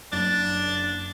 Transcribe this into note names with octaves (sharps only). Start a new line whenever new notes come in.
F#1 D4 A6